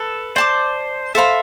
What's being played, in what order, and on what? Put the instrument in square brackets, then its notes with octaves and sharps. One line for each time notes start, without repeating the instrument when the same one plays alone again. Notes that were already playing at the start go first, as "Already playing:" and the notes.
Already playing: [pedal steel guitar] A4 [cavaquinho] B4
[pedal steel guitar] C5 [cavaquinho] D5 A5 D6
[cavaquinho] A4 C5 F5 B5 [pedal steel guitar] E5